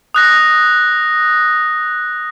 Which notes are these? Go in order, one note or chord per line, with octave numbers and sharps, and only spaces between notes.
D#6 F#6 A#6